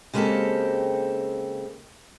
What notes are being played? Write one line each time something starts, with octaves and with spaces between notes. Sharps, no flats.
C#3 G#3 A#3 C4 G4 A4